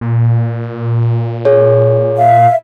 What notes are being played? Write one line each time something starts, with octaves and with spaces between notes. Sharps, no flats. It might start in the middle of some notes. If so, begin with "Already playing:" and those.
A#2
G#4 C#5
E5 F5